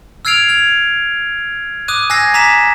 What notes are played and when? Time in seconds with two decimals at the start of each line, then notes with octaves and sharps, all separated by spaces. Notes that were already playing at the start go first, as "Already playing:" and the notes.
0.25 E6 F6 G#6 C7 D7 F7
0.49 G#6 F7
1.88 D6 D#6 F#6 D#7
2.10 G#5 E6 F#6 G#6 A#6 C7
2.34 G#5 A#5 D6 B6 E7